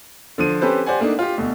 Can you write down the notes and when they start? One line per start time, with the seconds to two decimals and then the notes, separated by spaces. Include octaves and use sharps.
0.38 D3 F3 D#7
0.61 C4 C#4 G4 A4 B4 C5
0.86 G4 C5 D5 F#5 G#5
1.00 A3 A#3 D4 D#4
1.19 F4 G4
1.38 D2 B2